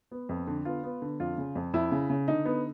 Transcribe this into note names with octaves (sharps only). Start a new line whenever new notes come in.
B3
F2
D3
B3 F4
B3
D3
F2 F4
C#3
F2
F2 E4
C#3
C#3
D3 D#4
B3